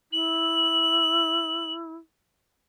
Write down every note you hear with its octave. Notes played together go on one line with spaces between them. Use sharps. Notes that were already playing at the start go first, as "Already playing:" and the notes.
E4 F#7